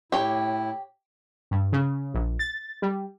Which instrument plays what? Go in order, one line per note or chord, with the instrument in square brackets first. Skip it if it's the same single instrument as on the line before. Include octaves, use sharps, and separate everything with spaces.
[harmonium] A2 E4 [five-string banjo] G4 C#5
[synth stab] G2
C#3
A#1
A6
G3